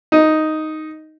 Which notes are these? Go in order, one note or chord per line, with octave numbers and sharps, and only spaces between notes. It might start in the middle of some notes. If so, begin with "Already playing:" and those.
D#4